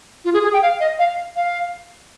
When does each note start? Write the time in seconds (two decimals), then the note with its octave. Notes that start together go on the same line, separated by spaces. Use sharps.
0.25 F4
0.34 G#4
0.44 G#4
0.53 G5
0.62 F5
0.80 D#5
0.99 F5
1.36 F5